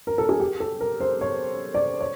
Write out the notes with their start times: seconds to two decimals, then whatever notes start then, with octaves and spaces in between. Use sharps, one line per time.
0.07 A#4
0.18 A4
0.29 G#4
0.40 G4
0.60 A4
0.81 A#4
1.00 C5
1.21 C#5
1.74 D5
2.01 C#5